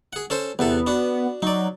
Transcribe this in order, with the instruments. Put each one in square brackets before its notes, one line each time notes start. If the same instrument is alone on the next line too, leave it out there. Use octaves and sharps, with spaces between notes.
[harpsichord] G#4 F#5
C#4 A4 C5
[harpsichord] E2 C3 A4 [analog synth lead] B3
[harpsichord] D4 F#4
[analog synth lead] F#3 [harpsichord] D#4 D5